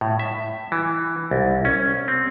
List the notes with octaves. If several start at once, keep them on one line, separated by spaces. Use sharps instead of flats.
A2
E5
E3
C2
C#4
C4